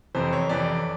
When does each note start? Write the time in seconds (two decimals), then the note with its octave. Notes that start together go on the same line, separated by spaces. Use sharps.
0.15 F2 C3 E3 C5
0.33 C#5
0.49 F2 C3 E3 D5